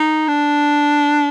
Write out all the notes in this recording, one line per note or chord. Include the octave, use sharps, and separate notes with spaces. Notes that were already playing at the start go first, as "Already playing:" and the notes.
Already playing: D#4
D4